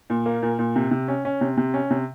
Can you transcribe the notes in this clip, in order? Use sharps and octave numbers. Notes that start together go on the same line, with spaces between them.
A#2
A#3
A#2
A#2
C3
C3
C#4
C#4
C3
C3
C#4
C3